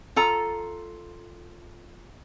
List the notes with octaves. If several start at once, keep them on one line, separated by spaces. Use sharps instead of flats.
F4 A4 A#5